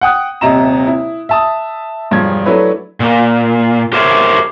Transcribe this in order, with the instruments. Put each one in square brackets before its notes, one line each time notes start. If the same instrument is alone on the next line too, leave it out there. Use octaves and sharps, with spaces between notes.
[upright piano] F#5 G5 D#6 F#6
D#1 C3 D#5 E5 A#5 E7
E4
E5 A5 D#6
E1 G2 F3 G#6
F#3 A3 D4 E4 B4 C#5
[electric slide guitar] A#2
G4 A#4 C5 C#5 E5